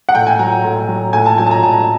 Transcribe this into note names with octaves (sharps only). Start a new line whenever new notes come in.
F#5
A2 G5
G#5
F#3 A#5
A2
F#3
A2 G#5
A5
F#3 G#5
A5
A#5
A2 A5